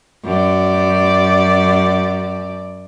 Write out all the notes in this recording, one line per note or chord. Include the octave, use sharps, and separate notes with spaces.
F#2 D5